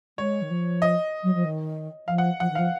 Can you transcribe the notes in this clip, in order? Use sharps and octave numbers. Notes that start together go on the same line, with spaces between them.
G#3 C#5
D#3
F3
D#5
F#3
F3
D#3
F3 F5
F#5
F3 F#5
D#3
F5
F3